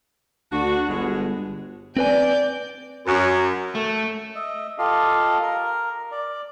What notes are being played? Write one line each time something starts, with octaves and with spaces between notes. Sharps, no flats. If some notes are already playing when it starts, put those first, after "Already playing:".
D2 D4 F#4
G1 B2 G#3
C4 B4 D5 G#5 G6
F#2
A3
D#5 E5
F4 G4 A4 D#5 F5
A#4
D5